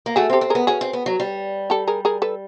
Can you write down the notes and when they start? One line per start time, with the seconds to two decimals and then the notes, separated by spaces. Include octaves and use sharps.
0.06 A#3
0.16 A3 F#4 G#4
0.30 C4
0.33 G4 A4
0.41 C4
0.50 B3 G#4 A#4
0.67 C#4 F#4 G#4
0.81 C4
0.93 B3
1.06 F#3
1.20 G3
1.70 G4 A4
1.87 G#4 A#4
2.05 G#4 A#4
2.22 A4 B4